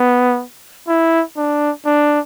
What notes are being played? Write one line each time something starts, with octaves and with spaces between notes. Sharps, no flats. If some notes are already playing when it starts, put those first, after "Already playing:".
Already playing: B3
E4
D4
D4